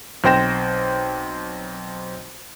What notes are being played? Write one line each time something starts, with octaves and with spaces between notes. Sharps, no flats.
B1 C4 C5 G5 A#6 E7